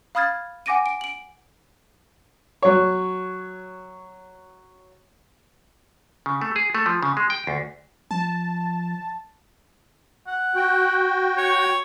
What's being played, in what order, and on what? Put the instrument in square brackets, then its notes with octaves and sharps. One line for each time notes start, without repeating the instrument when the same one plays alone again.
[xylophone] F5 B5 D#6 F6 G#6 A6
F#5 G#5 D6 A#6 D7 D#7
D7
D7 F#7
[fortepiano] F#3 C#5
[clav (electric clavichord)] C#3
A3
G#4
A3
F3
C#3
G#3
G5
D2
[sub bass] F3 [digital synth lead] A5
[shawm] F#5
[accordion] F#4 G5
[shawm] C#5